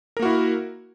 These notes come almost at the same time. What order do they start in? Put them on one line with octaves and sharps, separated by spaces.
A#4 A#3 F#4 E4